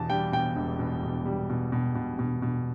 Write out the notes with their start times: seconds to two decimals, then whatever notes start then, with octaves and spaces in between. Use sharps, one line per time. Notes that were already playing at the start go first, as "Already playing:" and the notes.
Already playing: E2 B2 A5
0.10 G3 G5
0.32 B2 G5
0.56 E1
0.79 B2
1.03 B2
1.26 G3
1.49 B2
1.72 B2
1.95 B2
2.19 B2
2.42 B2